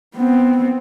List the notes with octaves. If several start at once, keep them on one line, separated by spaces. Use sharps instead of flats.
B3 C4